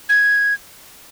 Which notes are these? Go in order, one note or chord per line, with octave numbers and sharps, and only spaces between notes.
G#6